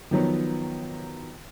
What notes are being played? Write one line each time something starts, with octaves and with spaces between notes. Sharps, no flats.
D#3 F3 F#3 B3